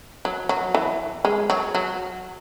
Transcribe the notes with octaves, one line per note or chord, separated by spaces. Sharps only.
F#3
F#3
E3
G#3
F#3
F#3